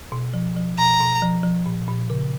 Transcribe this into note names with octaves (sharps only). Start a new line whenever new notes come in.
B2
F3
F3
B2 A#5
B2
F3
F3
A#2
A#2
C#3